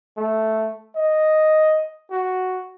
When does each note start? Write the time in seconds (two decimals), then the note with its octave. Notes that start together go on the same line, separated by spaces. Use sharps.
0.18 A3
0.96 D#5
2.11 F#4